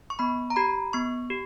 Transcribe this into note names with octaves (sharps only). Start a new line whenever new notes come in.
C#6
B3 B5
A#5
G4 B5
B3 C#6
G4